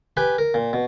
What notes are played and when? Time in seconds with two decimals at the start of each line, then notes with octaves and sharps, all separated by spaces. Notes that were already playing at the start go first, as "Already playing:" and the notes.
0.17 G4 B4 G5 G#5
0.38 A#4
0.54 A#2
0.73 B2